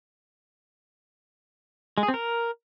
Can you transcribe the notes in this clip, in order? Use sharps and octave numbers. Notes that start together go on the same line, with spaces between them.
G#3
G#4
C4
A#4